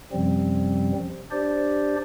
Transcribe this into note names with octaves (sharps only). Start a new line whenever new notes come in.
F#2 C3 F3 G3 C4
D4 G4 C5 D5